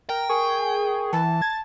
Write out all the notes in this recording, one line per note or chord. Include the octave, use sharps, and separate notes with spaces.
A#4 G5
G#4 A#4 C#6
E3 A5
G#6 A6